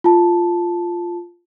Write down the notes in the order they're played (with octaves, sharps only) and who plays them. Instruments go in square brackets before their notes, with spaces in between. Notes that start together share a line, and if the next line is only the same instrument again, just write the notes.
[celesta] F4 A5